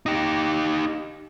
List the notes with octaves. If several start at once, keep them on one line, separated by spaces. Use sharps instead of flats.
D#4 G4